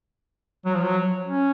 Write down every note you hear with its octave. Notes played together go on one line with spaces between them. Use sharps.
F#3
F3
F#3
C#4